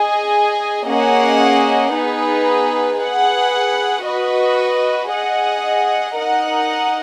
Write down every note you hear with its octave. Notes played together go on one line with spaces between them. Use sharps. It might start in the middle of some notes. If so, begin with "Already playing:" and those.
Already playing: G#4 D#5 G#5
A#3 C#4 G#4 D#5 F#5
B3 D#4 G#4 B4
G#4 B4 F#5
F#4 B4 D#5
G#4 D#5 F#5
D#4 A#4 D#5 F#5